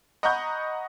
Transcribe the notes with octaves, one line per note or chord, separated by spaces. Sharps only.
D#5 F#5 A#5 B5 C#6 G6